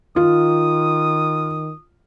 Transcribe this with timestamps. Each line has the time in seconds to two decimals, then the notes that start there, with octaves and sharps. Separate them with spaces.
0.16 D#3 F4 D#6